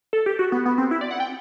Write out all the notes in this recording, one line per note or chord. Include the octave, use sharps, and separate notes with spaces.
A4
G4
F#4
B3
B3
C4
E4
D5
F#5
G5